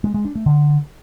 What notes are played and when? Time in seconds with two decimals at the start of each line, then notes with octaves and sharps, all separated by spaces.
0.04 G#3
0.14 G#3
0.25 D4
0.35 A3
0.46 D3